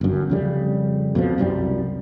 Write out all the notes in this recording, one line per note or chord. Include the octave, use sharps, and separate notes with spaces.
G1 F#2
F2 C#3 G3
F2 B2 F3
C2 F#2 F#3 G3